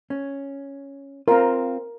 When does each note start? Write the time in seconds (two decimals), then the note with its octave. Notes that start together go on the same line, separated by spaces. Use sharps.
0.10 C#4
1.28 C4 F4 A#4 F5